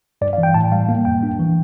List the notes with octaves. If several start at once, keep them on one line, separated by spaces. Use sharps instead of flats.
G2 D5
F5
E3
G5
A2 A5
G3 F5
A#3 F5
F2 G5
D4
E3